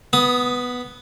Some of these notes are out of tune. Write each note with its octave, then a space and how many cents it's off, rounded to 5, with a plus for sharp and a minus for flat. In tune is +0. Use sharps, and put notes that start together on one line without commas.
B3 +0 D#6 +10